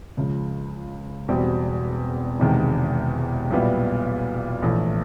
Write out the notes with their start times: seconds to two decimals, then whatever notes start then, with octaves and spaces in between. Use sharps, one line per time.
0.17 C#2 C#3 F3
1.28 E1 E2 B2 G3 C4
2.40 E1 E2 C3 D#3 G#3
3.51 B1 A#2 G3 B3 E4
4.62 A#1 A2 E3 A3